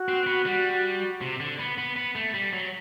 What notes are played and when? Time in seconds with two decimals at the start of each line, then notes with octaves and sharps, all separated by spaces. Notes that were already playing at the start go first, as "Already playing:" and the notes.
Already playing: F#4
0.08 C4
0.27 B3
0.46 G3
1.21 C3
1.40 D3
1.59 B3
1.78 B3
1.96 B3
2.15 A3
2.34 G3
2.53 F#3